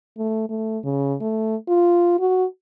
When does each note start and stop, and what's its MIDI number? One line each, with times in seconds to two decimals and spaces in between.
0.18 0.48 57
0.49 0.79 57
0.84 1.15 49
1.20 1.56 57
1.68 2.17 65
2.19 2.45 66